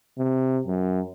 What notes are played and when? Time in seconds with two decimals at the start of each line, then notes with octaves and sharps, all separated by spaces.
0.18 C3
0.67 F#2